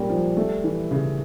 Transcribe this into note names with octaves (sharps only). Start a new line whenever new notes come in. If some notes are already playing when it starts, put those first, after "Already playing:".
Already playing: A#2 G3 A#3 C#4
F3
A3
E3
C#3